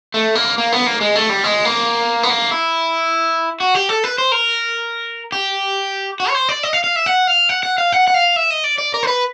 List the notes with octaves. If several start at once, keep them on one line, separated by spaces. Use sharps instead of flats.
A3
A#3
A#3
B3
A#3
G#3
A3
G3
G#3
A#3
B3
A#3
E4
F#4
G4
A4
B4
C5
A#4
G4
F#4
C#5
C5
D5
D#5
F5
F5
E5
F#5
F5
F#5
F#5
F5
F#5
F#5
F5
E5
D#5
D5
D5
A#4
C5
B4